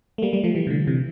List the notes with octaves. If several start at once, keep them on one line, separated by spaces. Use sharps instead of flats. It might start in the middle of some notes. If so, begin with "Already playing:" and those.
A3
G3 A#3
G3 A#3
F3 A3
E3 G3
C3
D3
C3 E3